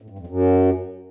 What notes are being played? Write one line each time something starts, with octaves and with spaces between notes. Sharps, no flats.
A2
G2
F2
F#2